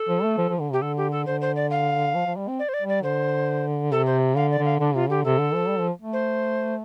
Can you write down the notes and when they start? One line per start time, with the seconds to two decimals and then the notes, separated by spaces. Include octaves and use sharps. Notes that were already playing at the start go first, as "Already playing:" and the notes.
Already playing: A4
0.09 F3
0.24 A3
0.38 F3
0.49 F3
0.60 D3
0.72 C3 G4
0.82 D3 A4
0.97 G4
1.12 A4
1.26 D3 C5
1.41 C5
1.56 D5
1.71 F5
2.15 F3
2.27 F3
2.37 G3
2.48 C4
2.59 D5
2.69 C5
2.74 D5
2.82 G3
2.89 D5
3.03 D3 C5
3.92 C3 A4
4.06 C5
4.36 D3 F5
4.51 D5
4.58 D3
4.65 F5
4.80 D3 D4
4.95 C3 F4
5.09 D3 G4
5.25 C3 A4
5.39 D3
5.54 F3
5.69 G3
5.80 F3
6.02 A3
6.13 C5